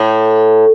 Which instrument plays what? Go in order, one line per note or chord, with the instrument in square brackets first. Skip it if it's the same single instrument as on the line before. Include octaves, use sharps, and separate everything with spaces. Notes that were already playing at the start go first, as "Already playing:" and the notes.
Already playing: [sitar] A2